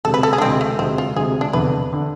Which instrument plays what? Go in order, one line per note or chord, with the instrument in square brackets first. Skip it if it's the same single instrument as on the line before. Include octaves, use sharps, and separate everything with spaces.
[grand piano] D2 C3 G#3 [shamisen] A4
[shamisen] B4
A4
G#4
D4
[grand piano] D2 C3 G#3 [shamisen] C4
[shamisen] A3
[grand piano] D2 C3 G#3 [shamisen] C4
[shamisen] F4
[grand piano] D2 C3 G#3 [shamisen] G#4
[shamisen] D4
[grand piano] F1 E2 D3 [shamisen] B4
[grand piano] D3